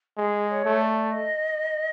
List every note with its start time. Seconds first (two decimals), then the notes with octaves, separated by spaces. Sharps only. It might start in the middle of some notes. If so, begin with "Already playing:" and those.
0.18 G#3 G#4
0.50 C#5
0.65 A3
0.81 D5
1.11 D#5